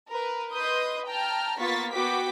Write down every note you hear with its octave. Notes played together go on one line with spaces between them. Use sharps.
A#4 B4
B4 D#5 C6 D#6 G6
G5 A5 A#5 F6
A#3 B3 F4 C#6 A6 B6
B3 F#4 G5 D6 B6